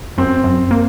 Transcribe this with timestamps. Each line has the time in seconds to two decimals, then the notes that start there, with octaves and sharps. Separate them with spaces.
0.18 F#2 C4
0.44 F#2
0.71 A#3